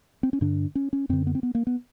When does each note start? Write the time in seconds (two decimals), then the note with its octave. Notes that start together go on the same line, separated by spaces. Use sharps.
0.23 C4
0.33 C#4
0.41 G2 D3 D4
0.75 C#4
0.93 C#4
1.09 F#2 D3 C4
1.27 B3
1.35 C4
1.43 B3
1.55 A#3
1.67 B3